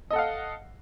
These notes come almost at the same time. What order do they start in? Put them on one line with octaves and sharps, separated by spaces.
D#5 A4 F#5 F5